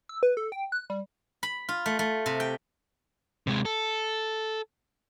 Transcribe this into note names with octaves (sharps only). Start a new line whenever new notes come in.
E6
B4
A4
G5
F#6
G3
B5
F4
A3
A3
C3
G5
C3 G#3
A4